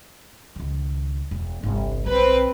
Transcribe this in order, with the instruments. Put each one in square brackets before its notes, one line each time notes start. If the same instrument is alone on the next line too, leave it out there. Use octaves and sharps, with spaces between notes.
[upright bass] C#2 D#3
E1
G1 C2
[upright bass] B1 [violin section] C4 B4